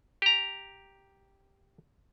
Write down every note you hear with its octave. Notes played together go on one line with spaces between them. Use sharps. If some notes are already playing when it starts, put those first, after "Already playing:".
G4 A#5